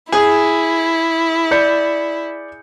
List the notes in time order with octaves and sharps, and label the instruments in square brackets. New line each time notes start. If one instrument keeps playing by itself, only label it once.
[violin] E4 [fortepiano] G#4
[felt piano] D5 G6 C#7